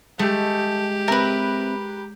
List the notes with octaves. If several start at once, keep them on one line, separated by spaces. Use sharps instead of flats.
G#3 A3 G4
C4 A#4 B4 E5